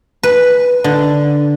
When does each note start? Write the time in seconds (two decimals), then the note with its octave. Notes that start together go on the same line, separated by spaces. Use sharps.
0.23 B4
0.84 D3